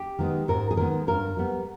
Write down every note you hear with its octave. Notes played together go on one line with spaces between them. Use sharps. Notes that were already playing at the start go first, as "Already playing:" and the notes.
Already playing: G4
D#3 G#3 B3
G#2 A#4
G#4
D#3 G#3 B3 A#4
G2 A#4
G3 B3